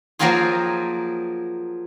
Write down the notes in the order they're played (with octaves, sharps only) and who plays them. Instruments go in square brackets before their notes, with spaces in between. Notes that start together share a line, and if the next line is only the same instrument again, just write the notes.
[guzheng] F3 F#3 A#3 C4 F4 G#4